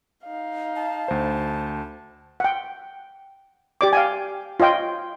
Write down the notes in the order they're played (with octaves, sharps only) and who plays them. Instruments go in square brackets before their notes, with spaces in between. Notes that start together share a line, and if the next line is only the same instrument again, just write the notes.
[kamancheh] D#4 F5
[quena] A5
[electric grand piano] D2 C5
[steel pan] F#5 G5
G4 D5 D6
F5 G5 G#5
F4 C#5 D#5 G5